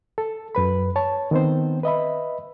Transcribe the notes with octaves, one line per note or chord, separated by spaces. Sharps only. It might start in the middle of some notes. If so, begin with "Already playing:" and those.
A4
F#2 B4 B5
C#5 A5
D#3 B3 C4 C5
B4 D#5 E5 B5